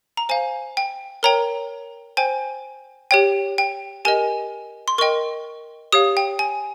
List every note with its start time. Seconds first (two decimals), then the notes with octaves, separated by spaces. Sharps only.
0.17 A#5
0.29 C5 F5 G#5
0.77 G5
1.23 A#4 C#5 G5 A#5
2.17 C5 G5 G#5
3.11 G4 C#5 G5
3.58 G5
4.05 G4 A#4 D#5 G#5
4.88 C6
4.98 A#4 D#5 G5 C#6
5.92 G4 C#5 F5 D#6
6.17 G5
6.39 G#5